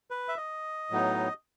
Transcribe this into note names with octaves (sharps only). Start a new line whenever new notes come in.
B4
E5
D#5
A2 F#3 B3 D#4